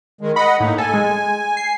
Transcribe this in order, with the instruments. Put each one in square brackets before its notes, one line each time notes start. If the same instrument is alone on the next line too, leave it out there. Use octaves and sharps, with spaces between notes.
[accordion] D#3 G#3
[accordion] D#5 F#5 [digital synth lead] B5
[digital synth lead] A2 [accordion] A#3 D#4
[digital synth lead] A4 [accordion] G#5
[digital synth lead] G#3
C7